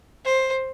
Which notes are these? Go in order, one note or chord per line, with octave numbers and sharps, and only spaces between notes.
C5